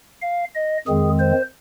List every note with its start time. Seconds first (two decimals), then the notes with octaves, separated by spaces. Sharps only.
0.22 F5
0.55 D#5
0.87 F2 D#3 G#3 C4 G#4
1.20 C5